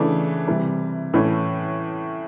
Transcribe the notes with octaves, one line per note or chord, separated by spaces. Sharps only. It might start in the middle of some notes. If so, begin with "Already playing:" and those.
Already playing: C#3 E3 A3 D4
C3 E3 G3
A2 E3 A3 C#4